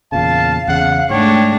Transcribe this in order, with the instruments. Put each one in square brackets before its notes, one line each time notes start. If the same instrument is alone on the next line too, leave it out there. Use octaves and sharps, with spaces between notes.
[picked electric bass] E2 A#2 C#3 [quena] F5 [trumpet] A5
[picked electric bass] E2 C#3 [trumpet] F#5
[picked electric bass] G#2 [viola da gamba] G#3 A3 D4 [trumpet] C#5 [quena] G5